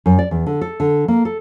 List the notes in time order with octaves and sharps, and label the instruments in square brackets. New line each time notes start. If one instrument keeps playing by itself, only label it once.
[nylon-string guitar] F#2
D5
E2
D3
A4
D3
A#3
A4